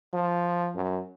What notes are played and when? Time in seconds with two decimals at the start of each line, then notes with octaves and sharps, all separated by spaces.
0.13 F3
0.75 F#2